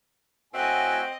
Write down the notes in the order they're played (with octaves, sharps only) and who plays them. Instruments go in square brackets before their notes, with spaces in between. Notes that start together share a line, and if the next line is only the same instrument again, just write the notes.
[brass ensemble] A2 F#5 G#5 [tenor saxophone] C4 [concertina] F#4 E5 [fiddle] D#5